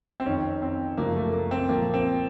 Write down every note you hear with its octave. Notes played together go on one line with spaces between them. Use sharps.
C4
F2 D#3 C#4
C4
F#2 C#3 F3 A#3
A3
A#3
C4
A#2 F3 A#3
C4